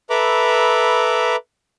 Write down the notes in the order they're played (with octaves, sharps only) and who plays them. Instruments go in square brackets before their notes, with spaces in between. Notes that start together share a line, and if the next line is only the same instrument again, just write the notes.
[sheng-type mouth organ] A4 B4 E5 A#5 B5 D6